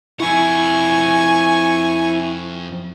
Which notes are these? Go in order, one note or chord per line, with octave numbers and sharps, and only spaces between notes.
F2 E4 F#5 G#5 C#6